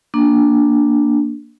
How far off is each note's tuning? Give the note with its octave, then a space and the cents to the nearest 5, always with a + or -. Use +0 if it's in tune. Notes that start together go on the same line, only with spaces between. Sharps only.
A#3 +0 D4 +0